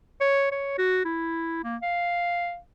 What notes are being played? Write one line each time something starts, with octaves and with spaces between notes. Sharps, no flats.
C#5
C#5
F#4
E4
A#3
F5